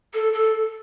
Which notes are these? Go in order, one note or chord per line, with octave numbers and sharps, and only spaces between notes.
A4
A4